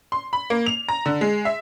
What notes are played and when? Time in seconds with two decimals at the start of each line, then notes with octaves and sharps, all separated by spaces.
0.12 C6
0.33 B5
0.50 A#3
0.66 F7
0.88 A#5
1.06 D3
1.21 G#3
1.45 E5